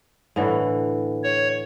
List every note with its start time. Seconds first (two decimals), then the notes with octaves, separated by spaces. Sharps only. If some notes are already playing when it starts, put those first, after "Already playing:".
0.36 A2 D3 E3
1.24 C#5